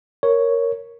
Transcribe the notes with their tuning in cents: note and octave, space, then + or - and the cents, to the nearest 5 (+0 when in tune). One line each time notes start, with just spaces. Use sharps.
A#4 +0 C#5 +0